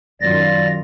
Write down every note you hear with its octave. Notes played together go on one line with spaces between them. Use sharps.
F#2 D#3 F4 D5 A6 A#6